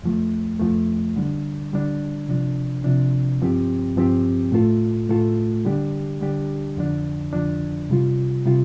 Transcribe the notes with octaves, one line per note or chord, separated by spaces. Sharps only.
F2 F3 A3
F2 F3 A3
D3 G3 D4
D3 G3 D4
C3 F3 D4
C3 F3 D4
G2 F3 C4 G4
G2 F3 C4 G4
A2 A3 F4 A4
A2 A3 F4 A4
D3 G3 D4 G4
D3 G3 D4 G4
F2 D3 F3 D4
F2 D3 F3 D4
C3 G3 F4
C3 G3 F4